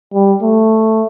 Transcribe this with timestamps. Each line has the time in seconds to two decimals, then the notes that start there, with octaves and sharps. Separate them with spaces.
0.14 G3
0.42 A3